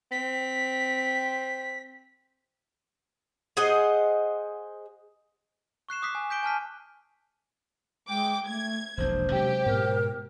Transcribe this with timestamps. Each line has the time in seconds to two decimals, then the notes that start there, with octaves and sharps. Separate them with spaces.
0.11 C4 B6
3.57 G#4 C5 D#5 F#5
5.89 C#6 F#6 C7 E7
6.02 D6 D#6 F#6 B6 C7
6.15 G#5
6.30 G6 B6 D7 G7
6.43 G#5 A5 F6 B6
8.09 G#3 G5 D6
8.47 A3 G#6
8.97 E1 A#1 B2 D4 C5
9.32 C3 F#3 G#3 G4
9.66 G#2 B2 A#4